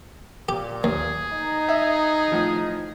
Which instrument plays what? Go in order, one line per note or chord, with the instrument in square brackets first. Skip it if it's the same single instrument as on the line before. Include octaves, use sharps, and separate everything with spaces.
[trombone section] A#2 [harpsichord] G4
[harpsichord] D#2 [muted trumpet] G#4
[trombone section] D#4
[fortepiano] E5
A2 F3